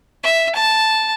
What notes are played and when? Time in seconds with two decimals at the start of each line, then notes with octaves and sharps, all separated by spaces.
0.23 E5
0.55 A5